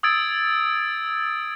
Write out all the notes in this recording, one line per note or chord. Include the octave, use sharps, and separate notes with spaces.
D#6 E6 G#6 A6 D7